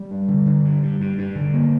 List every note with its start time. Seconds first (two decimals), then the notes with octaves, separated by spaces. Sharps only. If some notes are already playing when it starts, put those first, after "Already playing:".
Already playing: G3
0.11 G2
0.28 D3
0.46 D3
0.65 G2
0.83 G2
1.01 G2
1.18 G2
1.35 D3
1.54 A#3